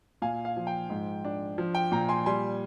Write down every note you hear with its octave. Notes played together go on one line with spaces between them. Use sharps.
A#2 F5 G#5
F5
F3
G5
G#2
D4
F3
G5
A#2 G5 A#5
G#5 C6
G3 G#5 C6